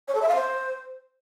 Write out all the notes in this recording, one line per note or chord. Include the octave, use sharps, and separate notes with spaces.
C#5
A4
E5
F5
C5